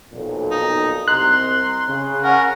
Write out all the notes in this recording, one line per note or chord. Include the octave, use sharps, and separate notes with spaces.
B1 F2 A#2
D#4
C2 D#5 A#5 C6 F#6
C#3
C#4 A#4 F#5